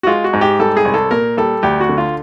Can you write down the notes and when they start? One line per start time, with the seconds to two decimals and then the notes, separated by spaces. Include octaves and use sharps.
0.03 F#4
0.07 G#3 F4
0.24 F#4
0.33 G#2
0.41 G4
0.59 G3 A4
0.77 G#4
0.85 C2
0.94 A4
1.11 A#2 A#4
1.37 G3 A4
1.63 D2 G4
1.81 F#4
1.89 D3
1.98 F4